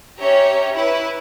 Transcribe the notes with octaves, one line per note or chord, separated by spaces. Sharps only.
C#4 G4 C#5 E5 A#5
E4 B4